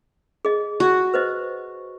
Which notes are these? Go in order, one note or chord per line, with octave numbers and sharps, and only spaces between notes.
G#4 D#5
F#4
B4 C5 D#5